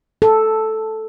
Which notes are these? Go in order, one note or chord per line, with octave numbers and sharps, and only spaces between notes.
A4